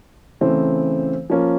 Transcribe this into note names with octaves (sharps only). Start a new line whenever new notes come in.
C#3 E3 A3 C4 E4
F3 A#3 C#4 F4